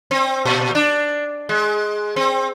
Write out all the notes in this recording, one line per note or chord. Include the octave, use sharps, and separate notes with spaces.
C4
A#2
D4
G#3
C4